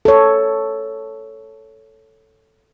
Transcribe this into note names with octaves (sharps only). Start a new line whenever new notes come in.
A4 C#5